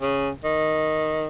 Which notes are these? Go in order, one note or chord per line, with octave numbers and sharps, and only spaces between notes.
C#3
D#3